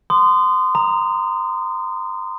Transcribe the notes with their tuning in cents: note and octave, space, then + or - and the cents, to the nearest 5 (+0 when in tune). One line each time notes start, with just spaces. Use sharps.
C6 -25 D#6 -30
A#5 +0 D#6 +0